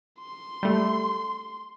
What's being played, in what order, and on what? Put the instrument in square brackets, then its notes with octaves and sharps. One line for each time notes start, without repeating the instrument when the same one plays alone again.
[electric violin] C6
[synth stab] G3 A3